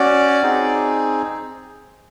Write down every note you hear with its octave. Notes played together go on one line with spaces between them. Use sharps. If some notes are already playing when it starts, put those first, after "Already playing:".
Already playing: C#4 F#4 D5
C4 D#4 G#4